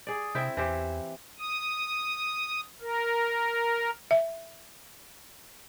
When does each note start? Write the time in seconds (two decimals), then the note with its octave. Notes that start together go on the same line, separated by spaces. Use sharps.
0.07 G#4 D5
0.35 C3 C4 E4 G5
0.57 E2 E3 G4 C5
1.39 D#6
2.81 A#4
4.11 E5